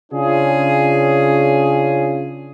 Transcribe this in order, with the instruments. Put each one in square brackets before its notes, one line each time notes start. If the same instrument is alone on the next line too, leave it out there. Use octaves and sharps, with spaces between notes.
[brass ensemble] C#3 C#4 D4 F4 G#4